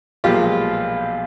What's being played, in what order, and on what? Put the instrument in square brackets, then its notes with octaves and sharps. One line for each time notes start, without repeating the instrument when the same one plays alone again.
[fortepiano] B1 A#2 F3 G#3 F4 G4